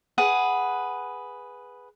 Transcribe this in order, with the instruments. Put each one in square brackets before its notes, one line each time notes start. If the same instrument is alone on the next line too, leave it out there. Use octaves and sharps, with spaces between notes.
[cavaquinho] G#4 B4 F#5